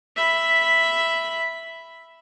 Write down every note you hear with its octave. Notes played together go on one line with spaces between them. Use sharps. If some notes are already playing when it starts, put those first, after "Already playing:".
E5 B5